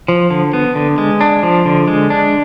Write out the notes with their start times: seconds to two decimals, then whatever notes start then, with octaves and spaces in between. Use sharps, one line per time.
0.08 F3
0.30 D3
0.53 B3
0.75 D3
0.98 G#3
1.21 D4
1.43 F3
1.65 D3
1.88 G#3
2.10 D4